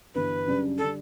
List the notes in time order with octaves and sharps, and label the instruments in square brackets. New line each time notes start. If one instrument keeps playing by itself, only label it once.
[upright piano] G1 G2 E3 [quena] B4
[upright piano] F#2 C#3 G3 D4
[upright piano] D3 G3 D4 [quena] A4